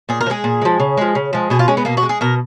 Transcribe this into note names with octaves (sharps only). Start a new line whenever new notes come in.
A#2 G#4
A#4
F3
G#3 G#4
A#2
F3 G#3
C#3
F3 G#3
C#3
F3 G#3
B2 G#4
F4
G#3 C#4
B3
B2 A#3
F#4
G#3
G#4
B2 A#4